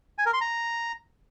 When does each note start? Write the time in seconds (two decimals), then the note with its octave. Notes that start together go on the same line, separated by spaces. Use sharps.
0.18 G#5
0.26 A#4
0.33 C6
0.41 A#5